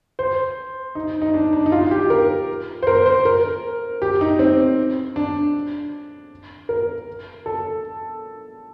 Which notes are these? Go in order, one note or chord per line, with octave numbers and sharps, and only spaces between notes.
C5
D#4
D#4
D4
D4
D#4
F4
G4
A#4
C5
A#4
C5
A#4
G4
D#4
C4
D4
A#4
A4